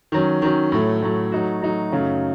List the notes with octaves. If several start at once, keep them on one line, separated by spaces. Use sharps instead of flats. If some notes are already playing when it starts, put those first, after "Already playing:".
D#3 F#3 C#4
D#3 F#3 C#4
A2 F#3 A3
A2 F#3 A3
F#3 A3 D#4 F#4
F#3 A3 D#4 F#4
F#2 C#3 F#3 A3 D#4